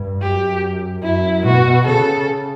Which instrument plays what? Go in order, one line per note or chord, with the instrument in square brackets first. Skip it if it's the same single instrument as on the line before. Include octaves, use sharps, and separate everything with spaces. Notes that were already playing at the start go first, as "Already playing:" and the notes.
Already playing: [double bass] G2
[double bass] F#2 [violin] G4
[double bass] F#2 [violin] E4
[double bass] B2 [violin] F#4
[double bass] C#3 [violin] A4